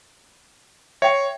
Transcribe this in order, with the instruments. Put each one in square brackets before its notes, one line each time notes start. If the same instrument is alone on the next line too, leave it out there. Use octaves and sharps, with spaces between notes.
[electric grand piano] C#5 [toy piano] E5 G5